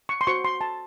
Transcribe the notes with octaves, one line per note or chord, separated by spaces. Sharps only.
C#6
C6
F#4 C5 C#6
C6
A5